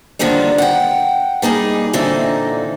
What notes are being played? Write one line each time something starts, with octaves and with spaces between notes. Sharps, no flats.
D3 D#3 F3 G3 A#3 D4
F#5 G5
G3 A#3 D#4 G#4
A#2 D3 E3 A#3 C4 D#4